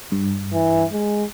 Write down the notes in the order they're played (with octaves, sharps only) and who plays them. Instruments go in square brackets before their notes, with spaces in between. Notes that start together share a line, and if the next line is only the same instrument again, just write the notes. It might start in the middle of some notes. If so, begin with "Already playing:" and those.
[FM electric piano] G2
[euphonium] E3
G#3